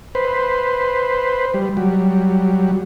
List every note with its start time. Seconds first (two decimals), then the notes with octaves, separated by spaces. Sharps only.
0.15 B4 C5
1.54 G3
1.77 F#3 G3